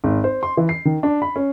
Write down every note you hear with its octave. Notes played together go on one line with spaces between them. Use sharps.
G#1
C5
C6
E3
C7
D#3
D4
B5
C#4